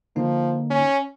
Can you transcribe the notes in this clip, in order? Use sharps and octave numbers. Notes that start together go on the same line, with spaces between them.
D3 F3 A#3 D#4
C#4